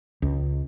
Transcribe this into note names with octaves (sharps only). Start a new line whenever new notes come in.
C#2